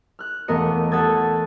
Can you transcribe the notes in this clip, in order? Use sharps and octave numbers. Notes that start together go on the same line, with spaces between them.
F6 F#6
E1 A3 B3 A#4 D#5 C#7
A3 A4 F#5 D#6 G#6 A6